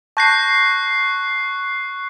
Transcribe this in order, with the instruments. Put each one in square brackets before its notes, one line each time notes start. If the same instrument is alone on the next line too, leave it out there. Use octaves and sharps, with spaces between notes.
[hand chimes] A5 G6 A#6 [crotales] C#6 F#6 C7